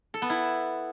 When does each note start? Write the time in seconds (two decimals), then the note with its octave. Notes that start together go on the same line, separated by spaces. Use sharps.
0.14 A4
0.22 B3
0.30 E4